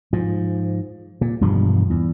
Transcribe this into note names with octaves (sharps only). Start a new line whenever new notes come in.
G#2 F3
A#2
E1 G2 F3
E2